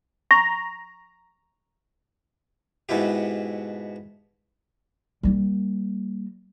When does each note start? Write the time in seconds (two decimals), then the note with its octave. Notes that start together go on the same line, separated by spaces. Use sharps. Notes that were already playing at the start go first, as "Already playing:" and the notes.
0.31 A#5 C#6
2.89 G#2 B2 B3 E4 G4
5.23 G3 A#3